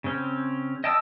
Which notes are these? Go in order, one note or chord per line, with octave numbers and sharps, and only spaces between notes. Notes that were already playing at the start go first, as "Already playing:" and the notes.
C#3 C4 C#4
D#5 G5 A5 D#6 E6